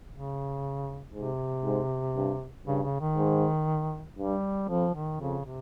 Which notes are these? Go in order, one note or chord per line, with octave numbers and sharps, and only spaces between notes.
C#3
G#2 C3
G#2
G2
G2 C#3
C#3
D#3
G#2
G2 G3
F2 F3
D#3
F2 C#3
C3